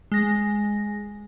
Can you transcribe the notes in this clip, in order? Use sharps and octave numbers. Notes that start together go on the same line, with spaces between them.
G#3 A#6